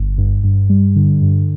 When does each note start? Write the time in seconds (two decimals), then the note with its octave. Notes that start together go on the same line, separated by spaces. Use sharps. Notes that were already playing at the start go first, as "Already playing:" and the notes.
Already playing: G1
0.18 G2
0.43 G2
0.70 G3
0.96 D3
1.22 G2